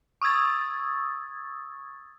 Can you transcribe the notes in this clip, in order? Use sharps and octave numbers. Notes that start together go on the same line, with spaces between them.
C#6 D#6 E6 G#6 A6